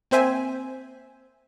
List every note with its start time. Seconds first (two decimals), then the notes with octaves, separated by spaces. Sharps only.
0.11 A#3 C4 C5 E5 G#5